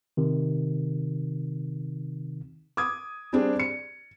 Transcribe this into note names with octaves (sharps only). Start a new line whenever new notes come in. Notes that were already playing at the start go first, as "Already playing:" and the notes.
C3 D#3
D6 D#6 G#6
G3 C4 D4 G#4
C#7